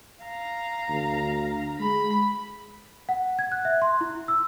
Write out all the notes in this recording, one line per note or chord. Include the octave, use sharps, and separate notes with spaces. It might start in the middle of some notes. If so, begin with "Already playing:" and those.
F5 A#5
D2
G#3 B5
F#5
G#6
F#6
E5
C6
E4
E6